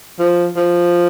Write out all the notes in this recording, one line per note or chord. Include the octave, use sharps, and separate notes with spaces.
F3
F3